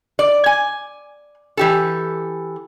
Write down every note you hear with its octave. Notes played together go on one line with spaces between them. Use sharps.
D5
G#5
E3 G4 A4